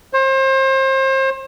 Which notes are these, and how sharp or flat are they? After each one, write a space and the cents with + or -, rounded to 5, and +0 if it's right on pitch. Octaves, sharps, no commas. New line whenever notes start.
C5 +35